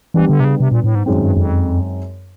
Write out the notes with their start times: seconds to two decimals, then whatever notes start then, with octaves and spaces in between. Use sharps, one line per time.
0.14 E3 G3 B3 D4
0.29 D3
0.40 C3
0.44 C#3
0.60 C3
0.72 A#2
0.84 A2
0.95 G#2
1.06 F#2 D#3 G#3 C4
1.21 G2
1.37 F2